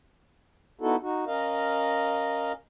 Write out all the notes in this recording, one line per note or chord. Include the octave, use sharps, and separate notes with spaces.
B3 D#4 E4 F#4 A4
D#4 F#4
C#4 A#4 D#5 F5